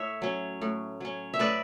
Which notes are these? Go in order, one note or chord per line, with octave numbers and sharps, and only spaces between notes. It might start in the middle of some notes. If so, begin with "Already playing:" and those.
Already playing: A2 C#5 E5
F#3 C#4
A2
F#3 C#4
E5
A2 B4 D5